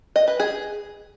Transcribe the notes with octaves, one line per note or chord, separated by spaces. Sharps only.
D#5
B4
G#4